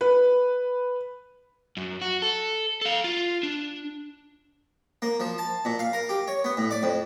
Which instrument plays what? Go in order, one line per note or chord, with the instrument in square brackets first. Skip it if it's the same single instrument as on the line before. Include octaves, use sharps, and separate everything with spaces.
[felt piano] B4
[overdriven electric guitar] F#2
F#4
A4
A4 F5
F4
D4
[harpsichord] A#3
F3
A5
A#2
F5
A#4
G4
C#5
B3
A2
D5
F2